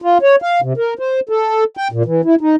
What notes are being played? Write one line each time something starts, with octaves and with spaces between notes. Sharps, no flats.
F4
C#5
F5
C3
A#4
C5
A4
G5
A#2
E3
E4
D#4